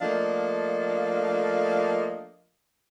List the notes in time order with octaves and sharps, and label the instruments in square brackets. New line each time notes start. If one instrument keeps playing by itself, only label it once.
[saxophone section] F3 A3 A#3 D4 D#5 F5